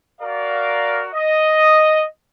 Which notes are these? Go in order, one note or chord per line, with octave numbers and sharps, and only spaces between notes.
F#4 A#4 D5 F5
D#5